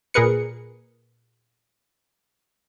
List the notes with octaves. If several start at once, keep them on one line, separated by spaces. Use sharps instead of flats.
A#2 G#4 A#4 B4 C#7